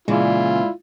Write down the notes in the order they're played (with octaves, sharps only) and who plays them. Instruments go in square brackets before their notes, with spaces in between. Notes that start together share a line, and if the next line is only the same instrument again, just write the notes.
[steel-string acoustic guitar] A#2 C#3 E3 [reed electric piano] G#3 D5 [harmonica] E4 F4